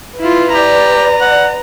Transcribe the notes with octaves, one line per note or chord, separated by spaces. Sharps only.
E4 F4 B4
G4 D5 A#5
F#5